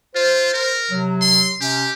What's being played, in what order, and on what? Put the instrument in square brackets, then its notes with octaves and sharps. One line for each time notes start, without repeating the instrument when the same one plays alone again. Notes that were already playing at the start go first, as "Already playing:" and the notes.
[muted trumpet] F4 [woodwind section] C5
[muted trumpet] A#4
[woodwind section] C3 F#3
[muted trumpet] C6
[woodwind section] C3 C#4 [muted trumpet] G4